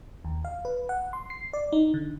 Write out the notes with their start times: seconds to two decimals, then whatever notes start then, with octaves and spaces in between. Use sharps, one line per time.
0.25 D#2
0.45 F5
0.65 B4
0.89 F#5
1.13 C6
1.30 C7
1.53 D5
1.72 D#4
1.94 D3